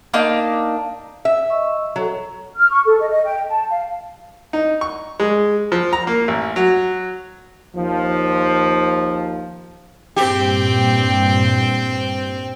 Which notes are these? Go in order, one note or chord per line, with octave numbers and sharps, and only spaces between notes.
A#3 D4 D#4 D6
E5
D#5 C#6 E6
F#3 A4 C#5
F6
C#6
A4
D#5
D#5
G5
A5
F5
D#4
C#6
G#3
F3
A#5
A#3
A1
F#3
D#2 F3
G2 A#2 C4 G4 G5